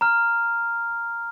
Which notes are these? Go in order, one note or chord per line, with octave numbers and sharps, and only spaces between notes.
A#5 F6